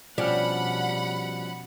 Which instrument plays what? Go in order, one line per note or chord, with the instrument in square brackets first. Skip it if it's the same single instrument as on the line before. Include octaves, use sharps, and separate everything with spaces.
[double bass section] B2 [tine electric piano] F3 C#4 F6 [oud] G3 D4 [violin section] F#5 B5